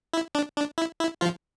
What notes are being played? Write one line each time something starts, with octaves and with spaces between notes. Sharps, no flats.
E4
D4
D4
E4
E4
F3 F4